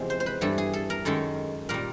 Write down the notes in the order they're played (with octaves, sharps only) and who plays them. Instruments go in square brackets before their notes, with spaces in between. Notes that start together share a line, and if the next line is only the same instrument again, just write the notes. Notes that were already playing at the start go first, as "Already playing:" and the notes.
Already playing: [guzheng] E2 C3 F3 G#3
C5
C5
B4
G2 E3 G3 A4
G#4
A4
A#4
F#2 D#3 G#3 A4
A#2 G3 A#4